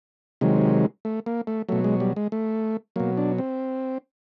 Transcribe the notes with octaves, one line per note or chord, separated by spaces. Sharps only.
C3 D#3 F#3 G#3
A3
A#3
A3
B2 F#3 A3
G#3
G3
G#3
A3
B2 F#3 A#3
D4
C4